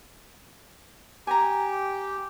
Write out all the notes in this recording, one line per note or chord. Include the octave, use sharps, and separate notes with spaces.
G4 G#5 A#5